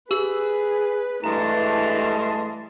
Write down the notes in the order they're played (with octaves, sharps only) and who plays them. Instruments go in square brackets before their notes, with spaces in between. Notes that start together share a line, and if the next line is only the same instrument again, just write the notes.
[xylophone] G4 E6 F#7 [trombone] G#4 [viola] B4
[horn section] G2 G#3 A5 [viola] E3 [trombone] A3 [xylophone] A#5